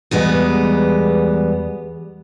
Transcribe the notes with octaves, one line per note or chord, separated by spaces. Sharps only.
E2 G3 G#3 B3